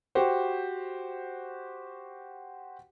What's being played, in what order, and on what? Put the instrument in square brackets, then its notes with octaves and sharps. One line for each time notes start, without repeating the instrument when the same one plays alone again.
[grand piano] F#4 G4 C5